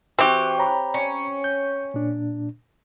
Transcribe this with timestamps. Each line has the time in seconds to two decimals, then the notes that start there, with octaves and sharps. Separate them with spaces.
0.19 E3 C4 F#4 G4
0.59 C#5 A#5 B5
0.94 C#4
1.44 G6
1.94 A#2 D4